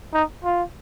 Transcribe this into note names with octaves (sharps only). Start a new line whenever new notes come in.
D#4
F4